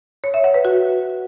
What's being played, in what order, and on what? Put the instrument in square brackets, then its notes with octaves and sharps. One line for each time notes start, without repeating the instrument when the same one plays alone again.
[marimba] C#5
E5
F#5
B4
F#4